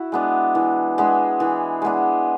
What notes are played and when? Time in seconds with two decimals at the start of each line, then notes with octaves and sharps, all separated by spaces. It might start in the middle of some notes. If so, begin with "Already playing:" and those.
Already playing: E4 F#4
0.12 G#3 B3 D4
0.55 E3
0.98 G#3 B3 D4
1.40 E3
1.82 G#3 B3 D4